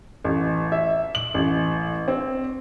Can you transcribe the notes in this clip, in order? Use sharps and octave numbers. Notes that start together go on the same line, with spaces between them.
A1
E5
F#7
A1
C4